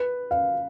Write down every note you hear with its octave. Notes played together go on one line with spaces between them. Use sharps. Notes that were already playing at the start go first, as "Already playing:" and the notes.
Already playing: B4
F5